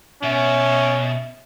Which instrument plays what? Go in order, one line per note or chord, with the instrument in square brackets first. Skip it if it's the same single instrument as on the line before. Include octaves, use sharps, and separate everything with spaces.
[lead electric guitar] B2 [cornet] C#4 [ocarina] E5